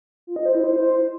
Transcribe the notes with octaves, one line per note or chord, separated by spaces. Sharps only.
F4
D#5
C5
E4
C5